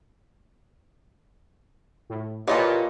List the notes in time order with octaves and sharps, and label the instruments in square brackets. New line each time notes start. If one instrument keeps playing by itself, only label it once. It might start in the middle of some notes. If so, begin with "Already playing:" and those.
[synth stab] A2
[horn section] A#2 [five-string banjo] E3 F4 A4 [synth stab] G4 B4 [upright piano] C#5 D#5